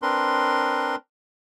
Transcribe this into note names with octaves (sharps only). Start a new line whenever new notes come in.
C4 D4 A#4 B4 C6